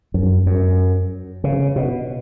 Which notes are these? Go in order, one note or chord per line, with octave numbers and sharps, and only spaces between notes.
F#2
F#2
C#3
B2